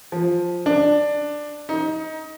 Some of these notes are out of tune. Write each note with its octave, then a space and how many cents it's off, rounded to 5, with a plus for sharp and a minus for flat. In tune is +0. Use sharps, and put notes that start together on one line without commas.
F3 +10
D4 +10
D#4 +20